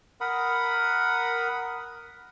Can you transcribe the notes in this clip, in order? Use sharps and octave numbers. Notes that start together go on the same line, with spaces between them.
A#4 F#5 B5 D#6